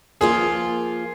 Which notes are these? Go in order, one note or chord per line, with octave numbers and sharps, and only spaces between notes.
F3 A#3 F4 G#4